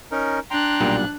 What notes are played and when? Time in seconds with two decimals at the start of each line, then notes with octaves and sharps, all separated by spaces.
0.11 C#4 D#4 A#4
0.51 D4 G5 A#5 C6 F#6
0.81 B1 A#2 G3